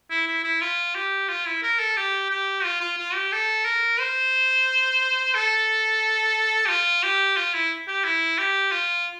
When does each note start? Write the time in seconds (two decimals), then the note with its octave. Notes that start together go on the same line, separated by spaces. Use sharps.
0.11 E4
0.27 E4
0.44 E4
0.61 F4
0.95 G4
1.29 F4
1.46 E4
1.63 A#4
1.80 A4
1.97 G4
2.30 G4
2.64 F4
2.81 F4
2.97 F4
3.15 G4
3.32 A4
3.65 A#4
4.00 C5
5.35 A4
6.65 G4
6.69 F4
7.03 G4
7.37 F4
7.54 E4
7.88 G4
8.04 E4
8.39 G4
8.72 F4